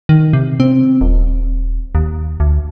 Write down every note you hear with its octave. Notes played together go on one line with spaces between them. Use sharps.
D#3
C3
C4
D#1
D#2
D2